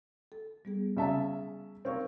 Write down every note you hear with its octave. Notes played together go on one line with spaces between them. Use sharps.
A4
G3 B3 G#4
C#3 E5 A5
C4 D#4 A#4 C#5 F5